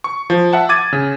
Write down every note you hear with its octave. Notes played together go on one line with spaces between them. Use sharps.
C#6
F3
E5 F#5 A5
D6 G#6 A6 D#7
C#3